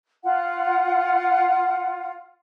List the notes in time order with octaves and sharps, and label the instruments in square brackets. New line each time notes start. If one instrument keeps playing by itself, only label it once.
[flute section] F4 F#5